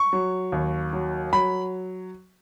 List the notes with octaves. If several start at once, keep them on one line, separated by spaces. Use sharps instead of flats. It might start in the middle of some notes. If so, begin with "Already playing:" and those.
Already playing: C#6
F#3
D#2
F#3
F#3 B5